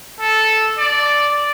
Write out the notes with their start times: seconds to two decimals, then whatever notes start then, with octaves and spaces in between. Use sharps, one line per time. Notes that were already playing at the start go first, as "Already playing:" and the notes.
0.20 A4
0.78 D5